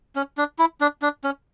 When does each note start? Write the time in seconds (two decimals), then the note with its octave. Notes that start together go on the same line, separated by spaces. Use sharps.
0.16 C#4
0.37 D4
0.59 E4
0.81 D4
1.02 D4
1.24 C#4